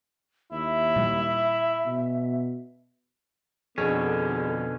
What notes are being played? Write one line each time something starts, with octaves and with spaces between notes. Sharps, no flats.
D#2 E4 E5
A#2 G3
B2
F2 B2 D3 C#4 G#4